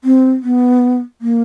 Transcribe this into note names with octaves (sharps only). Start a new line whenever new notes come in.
C4
B3
A#3